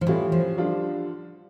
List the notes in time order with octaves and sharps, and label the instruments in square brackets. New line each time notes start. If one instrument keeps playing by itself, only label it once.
[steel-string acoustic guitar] F3
[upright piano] A2 G3 C#4 F4 [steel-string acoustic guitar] E3
[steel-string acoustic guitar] F3
[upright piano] D3 G3 D4 F4